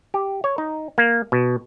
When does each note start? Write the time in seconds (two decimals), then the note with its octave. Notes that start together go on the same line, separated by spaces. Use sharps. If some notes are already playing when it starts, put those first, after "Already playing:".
0.14 G4
0.44 C#5
0.58 D#4
0.98 A#3
1.32 B2